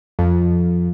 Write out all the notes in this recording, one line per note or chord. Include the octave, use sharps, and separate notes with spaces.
F2